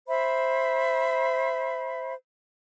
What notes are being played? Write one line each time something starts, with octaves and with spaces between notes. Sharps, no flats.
C5 E5 B5